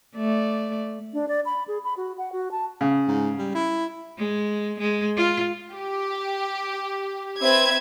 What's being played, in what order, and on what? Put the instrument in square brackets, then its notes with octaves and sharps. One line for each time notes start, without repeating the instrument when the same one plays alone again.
[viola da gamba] A3 D5
[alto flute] D4
D5
B5
G#4
B5
F#4
F#5
F#4
A5
[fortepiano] C#3
[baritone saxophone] G#2
G3
E4
[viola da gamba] G#3
G#3
F4
[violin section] G4
C4 B4 E5 G#6